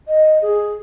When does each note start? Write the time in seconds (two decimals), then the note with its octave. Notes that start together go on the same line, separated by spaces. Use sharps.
0.07 D#5
0.42 G#4